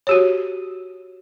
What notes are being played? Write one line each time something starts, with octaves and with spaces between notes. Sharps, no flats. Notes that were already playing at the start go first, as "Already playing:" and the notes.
F#4 G4 C#5